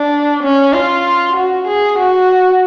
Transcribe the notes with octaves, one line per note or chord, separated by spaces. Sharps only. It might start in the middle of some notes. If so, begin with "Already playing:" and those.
Already playing: D4
C#4
F4
F#4
G#4
F#4